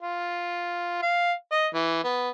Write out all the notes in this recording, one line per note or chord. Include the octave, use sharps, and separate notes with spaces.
F4
F5
D#5
E3
B3